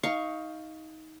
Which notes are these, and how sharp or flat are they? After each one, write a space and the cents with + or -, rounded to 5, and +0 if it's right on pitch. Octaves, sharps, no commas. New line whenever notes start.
D#4 +20 F5 +0 C#6 +0